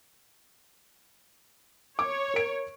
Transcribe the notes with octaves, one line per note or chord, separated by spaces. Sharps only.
C#5 D6
A#4 D7